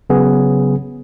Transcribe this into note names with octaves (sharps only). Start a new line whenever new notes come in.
C#3 F#3 B3 G#4